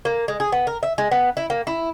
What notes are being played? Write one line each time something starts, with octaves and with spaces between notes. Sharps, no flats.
A#3
G#3
G#4
B3
A#4
E5
G#3
B3
E4
A#3
E4